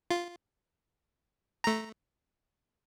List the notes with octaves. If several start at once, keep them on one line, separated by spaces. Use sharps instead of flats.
F4
A3 A#5